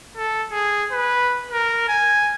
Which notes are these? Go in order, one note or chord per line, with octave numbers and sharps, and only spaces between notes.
A4
G#4
B4
A#4
G#5